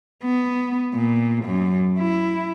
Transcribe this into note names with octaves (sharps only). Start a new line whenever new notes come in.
B3
A#2
F#2
E4